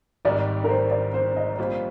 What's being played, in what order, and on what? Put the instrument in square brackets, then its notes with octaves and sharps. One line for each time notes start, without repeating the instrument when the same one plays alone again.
[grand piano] G#1 G#2 D#3 G3 [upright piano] D5
[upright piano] A#4
C5
D5
C5
D#5
[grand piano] A#1 A#2 G3 A#3 F4 [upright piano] C5